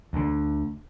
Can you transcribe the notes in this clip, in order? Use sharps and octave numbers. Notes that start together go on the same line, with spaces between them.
D2 D3